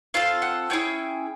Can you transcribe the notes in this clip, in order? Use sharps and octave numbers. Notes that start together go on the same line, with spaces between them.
C4 F4 A4 F5
F#5
A3 C#4 E4 G#4 G5